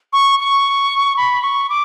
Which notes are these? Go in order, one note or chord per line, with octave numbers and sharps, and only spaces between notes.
C#6
C#6
B5
C#6
D6